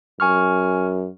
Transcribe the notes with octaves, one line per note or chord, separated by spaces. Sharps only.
F#2 G#5 C#6 F6